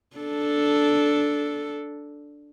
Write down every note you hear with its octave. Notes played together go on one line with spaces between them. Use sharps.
D4 A4